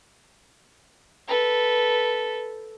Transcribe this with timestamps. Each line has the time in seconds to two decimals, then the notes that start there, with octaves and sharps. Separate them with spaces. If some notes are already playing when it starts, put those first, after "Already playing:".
1.28 A4 B4